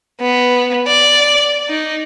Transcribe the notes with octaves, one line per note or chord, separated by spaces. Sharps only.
B3
D5
D#4